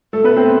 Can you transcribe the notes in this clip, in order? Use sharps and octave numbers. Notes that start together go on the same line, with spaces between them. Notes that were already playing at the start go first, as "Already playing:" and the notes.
A3 A4
B3 B4
C4 C5